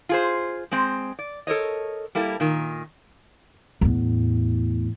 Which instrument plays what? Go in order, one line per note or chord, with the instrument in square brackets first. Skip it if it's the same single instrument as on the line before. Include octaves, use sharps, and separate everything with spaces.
[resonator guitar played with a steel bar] F4 G#4 C5
G#3 C4
D5
A4 A#4 C#5 D#5
G3 A#3 E4 A4
A#2 D#3
[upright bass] E2 A2